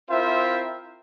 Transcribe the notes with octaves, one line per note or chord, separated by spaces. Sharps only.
C4 E4 F4 A#4 C5 E5